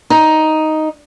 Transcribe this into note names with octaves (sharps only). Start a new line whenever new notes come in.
D#4